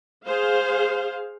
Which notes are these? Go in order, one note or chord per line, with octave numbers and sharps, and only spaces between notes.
G#4 C5 F5